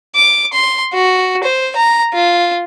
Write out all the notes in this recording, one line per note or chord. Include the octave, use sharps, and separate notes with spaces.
D6
C6
F#4
C5
A#5
F4